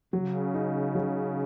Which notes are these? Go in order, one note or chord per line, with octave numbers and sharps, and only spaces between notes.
C#3 F#3
D#4
F#3